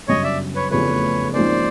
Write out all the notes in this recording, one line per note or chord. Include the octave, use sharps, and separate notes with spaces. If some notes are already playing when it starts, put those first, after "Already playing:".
G1 F#2 C#3 C#5 D#5
D5 E5
B4 C#5
F1 E2 C#3 F3 A3 B4 C#5
G#1 G#2 F3 A#3 C#4 C5 D5